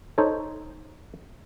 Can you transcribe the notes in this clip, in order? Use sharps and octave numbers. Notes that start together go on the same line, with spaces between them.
D#4 A4 C5 C#5